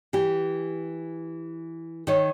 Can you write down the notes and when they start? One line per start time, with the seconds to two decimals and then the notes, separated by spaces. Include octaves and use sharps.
0.13 E3 G4
2.07 D#3 C#5